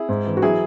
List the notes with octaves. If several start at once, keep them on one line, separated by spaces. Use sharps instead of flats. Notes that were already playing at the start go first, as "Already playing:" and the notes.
Already playing: E4 G#4
G#2
E3
F#4
F#3 E4 G#4